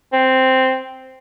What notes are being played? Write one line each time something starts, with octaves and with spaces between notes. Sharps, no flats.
C4